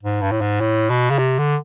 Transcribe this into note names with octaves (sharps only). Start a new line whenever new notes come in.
G#2
G2
A2
G#2
A2
B2
C#3
C3
D3